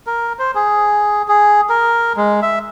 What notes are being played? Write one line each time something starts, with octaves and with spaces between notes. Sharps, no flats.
A#4
C5
G#4
G#4
A#4
G#3
E5